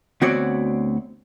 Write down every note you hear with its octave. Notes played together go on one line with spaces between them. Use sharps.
D2 B3 C4 F#4 C#5 D5